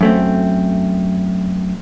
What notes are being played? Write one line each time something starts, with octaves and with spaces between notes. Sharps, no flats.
F#2 A3 C4